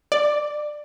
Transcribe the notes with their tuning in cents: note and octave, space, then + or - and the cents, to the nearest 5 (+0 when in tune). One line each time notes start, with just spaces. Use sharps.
D5 +20 D6 +0